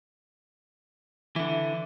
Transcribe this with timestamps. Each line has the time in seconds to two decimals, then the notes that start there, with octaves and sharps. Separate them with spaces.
1.36 D3 E3 E5